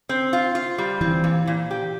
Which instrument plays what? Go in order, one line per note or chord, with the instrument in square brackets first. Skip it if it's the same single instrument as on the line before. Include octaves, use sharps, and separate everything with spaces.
[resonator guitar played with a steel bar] C4
F4
F4
G3
[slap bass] E3 [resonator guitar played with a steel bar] C4
[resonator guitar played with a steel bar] A#2
A#2
G4